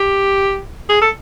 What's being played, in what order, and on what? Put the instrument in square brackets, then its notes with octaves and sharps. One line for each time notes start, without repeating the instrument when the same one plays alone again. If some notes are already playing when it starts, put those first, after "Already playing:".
Already playing: [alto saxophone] G4
G#4
A4